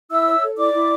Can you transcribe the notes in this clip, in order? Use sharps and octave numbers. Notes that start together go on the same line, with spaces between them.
E4 E5 E6
C#5
A4
E4 D5 D6
E4